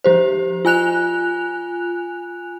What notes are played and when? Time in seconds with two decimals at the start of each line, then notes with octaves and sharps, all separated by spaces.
0.04 F3 G4 C5
0.65 F4 G#5 F#6 F7